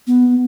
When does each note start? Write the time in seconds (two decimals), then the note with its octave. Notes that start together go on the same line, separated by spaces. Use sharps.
0.07 B3